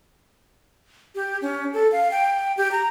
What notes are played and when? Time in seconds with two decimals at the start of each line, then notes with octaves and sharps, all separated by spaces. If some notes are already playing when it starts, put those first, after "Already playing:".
1.15 G4
1.42 C#4
1.73 A4
1.92 F5
2.11 G5
2.57 G4
2.72 A#5